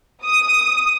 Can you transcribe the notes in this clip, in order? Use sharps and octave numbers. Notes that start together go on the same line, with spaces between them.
D#6